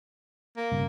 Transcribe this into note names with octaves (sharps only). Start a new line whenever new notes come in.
A#3
B1 G2 C#3